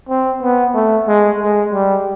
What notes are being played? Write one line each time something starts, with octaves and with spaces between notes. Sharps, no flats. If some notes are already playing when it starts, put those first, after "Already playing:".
C4
B3
A3
G#3
G#3
G3